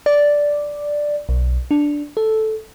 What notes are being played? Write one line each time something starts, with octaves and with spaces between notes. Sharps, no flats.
D5
B1
D4
A4